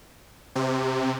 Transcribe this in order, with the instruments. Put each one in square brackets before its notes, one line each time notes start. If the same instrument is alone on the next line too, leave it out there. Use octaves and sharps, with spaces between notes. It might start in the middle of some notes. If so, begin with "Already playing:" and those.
[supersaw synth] C3